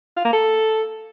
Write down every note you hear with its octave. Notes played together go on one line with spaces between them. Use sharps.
F4
A#3
A4